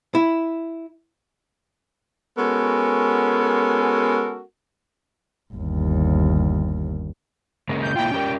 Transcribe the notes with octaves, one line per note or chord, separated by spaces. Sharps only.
E4
G#3 B3 C#4 F#4 A4 A#4
G1 D#2
C#3 G#3 A#3
G6
A#3 E4 F4 G5
C#4 G4 A#4